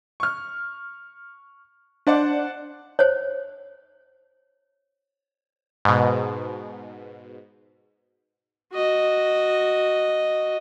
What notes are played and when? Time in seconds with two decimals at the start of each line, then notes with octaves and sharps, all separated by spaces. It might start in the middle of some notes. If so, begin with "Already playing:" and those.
0.20 C#6 F6
2.07 D4 C5 D5 F#5
2.99 C5 C#5
5.85 G#2 B2
8.73 F#4 D#5